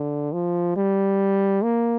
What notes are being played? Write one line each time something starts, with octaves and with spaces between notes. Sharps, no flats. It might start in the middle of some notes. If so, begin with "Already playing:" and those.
Already playing: D3
F3
G3
A#3